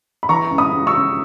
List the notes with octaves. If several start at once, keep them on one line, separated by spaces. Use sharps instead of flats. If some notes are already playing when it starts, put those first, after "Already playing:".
B5
E3 A#5 C#6
C#2
B5 D#6
C#2
C#6 E6
C#3